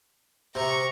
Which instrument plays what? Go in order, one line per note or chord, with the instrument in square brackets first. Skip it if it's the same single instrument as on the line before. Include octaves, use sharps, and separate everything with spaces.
[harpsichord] C3 [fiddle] A#5 C#6